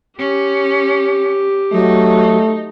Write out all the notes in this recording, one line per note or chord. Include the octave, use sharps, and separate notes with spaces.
C#4 G4
F#3 A3 D#4